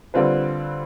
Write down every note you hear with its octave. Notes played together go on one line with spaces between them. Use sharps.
D3 G3 C4 F4 B4